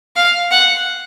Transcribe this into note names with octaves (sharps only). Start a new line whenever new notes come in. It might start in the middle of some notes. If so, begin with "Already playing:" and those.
F5
F#5